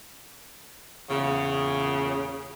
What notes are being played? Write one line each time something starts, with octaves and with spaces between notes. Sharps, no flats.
E2 A#2 C#3